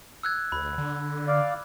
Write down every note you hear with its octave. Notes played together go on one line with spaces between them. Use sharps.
E6 F#6 G#6
D2 B5
D3
D5 F5